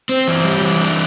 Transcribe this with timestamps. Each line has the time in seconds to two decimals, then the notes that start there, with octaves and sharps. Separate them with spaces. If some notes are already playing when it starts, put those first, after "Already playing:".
0.09 C4
0.27 E3
0.44 G3
0.61 E3
0.79 D4